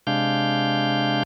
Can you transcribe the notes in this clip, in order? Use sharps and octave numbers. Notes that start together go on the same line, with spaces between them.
C3 G#3 D4 F5 G6